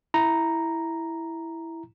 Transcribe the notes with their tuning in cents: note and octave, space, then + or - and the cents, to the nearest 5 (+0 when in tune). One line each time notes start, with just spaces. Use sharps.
E4 +0 A#5 +0